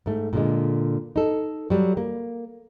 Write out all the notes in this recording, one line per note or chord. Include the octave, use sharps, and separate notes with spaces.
G#2 A3
A#2 D3 G#3
D#4 A4
F#3 G3
A#3